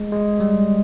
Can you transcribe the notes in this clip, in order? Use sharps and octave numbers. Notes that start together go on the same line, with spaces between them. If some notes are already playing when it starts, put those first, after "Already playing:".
Already playing: G#3
G#3
G3